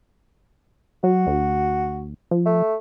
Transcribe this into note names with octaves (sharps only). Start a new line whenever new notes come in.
F#3 F#4
D2
F3
A3